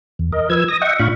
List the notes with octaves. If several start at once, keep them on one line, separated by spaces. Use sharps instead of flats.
E2
A#4 D#5
F3 B4 E6 G#6
D#6 A#6
D#5 E5 F#5 G5 C#6
A2 D4 F4 F5 B5 C#6